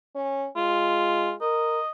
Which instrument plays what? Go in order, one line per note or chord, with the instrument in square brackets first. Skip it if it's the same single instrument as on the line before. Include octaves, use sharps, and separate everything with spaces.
[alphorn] C#4
[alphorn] G#3 [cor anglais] F4
[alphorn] A#4 [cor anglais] D#5